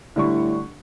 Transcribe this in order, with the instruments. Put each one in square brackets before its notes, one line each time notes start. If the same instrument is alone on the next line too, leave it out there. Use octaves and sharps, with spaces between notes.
[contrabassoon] A2 [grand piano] D3 G3 C#6